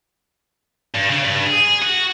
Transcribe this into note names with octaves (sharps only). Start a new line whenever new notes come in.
G2
C#3
G2
G#4
F#4